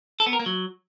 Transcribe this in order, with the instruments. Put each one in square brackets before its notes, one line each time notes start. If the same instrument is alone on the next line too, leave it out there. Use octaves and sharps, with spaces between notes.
[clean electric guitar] A4
B3
A#4
A#3
F#3